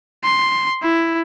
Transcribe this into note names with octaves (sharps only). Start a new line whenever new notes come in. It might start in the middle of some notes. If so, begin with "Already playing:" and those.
C6
E4